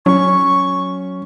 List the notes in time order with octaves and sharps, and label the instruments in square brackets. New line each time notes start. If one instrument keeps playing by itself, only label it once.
[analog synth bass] F#3 [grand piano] C#4 [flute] C#6